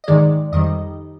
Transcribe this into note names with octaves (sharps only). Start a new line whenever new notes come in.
D#5
G#2 D#3 G#3 D5
F2 D#3 G3 D#5